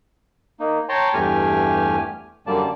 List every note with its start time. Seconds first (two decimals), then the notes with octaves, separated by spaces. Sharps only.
0.60 A#3 D#4
0.89 C#5 G5 A5 A#5 C6
1.14 E2 G2 A3 G4 G#5 F6
2.47 F#2 D3 G3 A#3 D5 A5